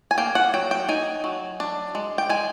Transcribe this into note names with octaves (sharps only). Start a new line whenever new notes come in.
G#5
A#3 G5
F#5
F#3 G5
G5
D#4 G#5
F#3
D4
G#3
G5
G#3 G#5